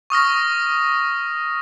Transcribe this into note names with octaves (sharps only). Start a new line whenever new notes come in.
C#6 D#6 F6 A#6